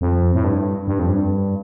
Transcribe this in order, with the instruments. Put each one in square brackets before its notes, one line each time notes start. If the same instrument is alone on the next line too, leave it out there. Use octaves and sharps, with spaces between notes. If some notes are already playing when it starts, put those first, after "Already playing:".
[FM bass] F2
A2
G2
G2
F2
G2